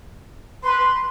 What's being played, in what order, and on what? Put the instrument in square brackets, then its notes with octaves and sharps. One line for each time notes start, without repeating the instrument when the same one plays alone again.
[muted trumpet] B4 [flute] C6